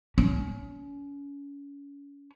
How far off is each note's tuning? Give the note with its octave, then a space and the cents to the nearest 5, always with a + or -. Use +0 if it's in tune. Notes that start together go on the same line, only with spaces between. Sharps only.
C#4 +35